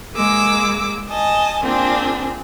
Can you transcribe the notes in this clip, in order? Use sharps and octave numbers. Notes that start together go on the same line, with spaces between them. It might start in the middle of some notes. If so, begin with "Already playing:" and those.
G#3 A#3 G#4 D6 E6
D#5 G#5 A5
A#3 C4 D4 F4 G#4